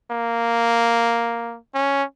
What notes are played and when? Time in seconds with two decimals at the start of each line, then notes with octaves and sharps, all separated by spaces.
0.11 A#3
1.74 C#4